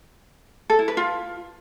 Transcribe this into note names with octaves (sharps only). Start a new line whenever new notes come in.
A4
E4
B4
F4